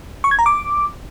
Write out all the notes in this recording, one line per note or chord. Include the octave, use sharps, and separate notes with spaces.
C#6
G#6
A#5
D6